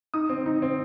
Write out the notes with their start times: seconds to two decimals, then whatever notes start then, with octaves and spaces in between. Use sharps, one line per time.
0.14 D#4 D#6
0.29 C4
0.46 D#4
0.62 C4